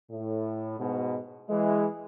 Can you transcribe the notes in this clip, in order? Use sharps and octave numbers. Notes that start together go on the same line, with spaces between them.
A2
G#2 B2
E3 G#3